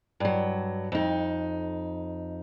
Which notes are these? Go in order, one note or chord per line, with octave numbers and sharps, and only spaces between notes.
G2 F#3
F2 D#4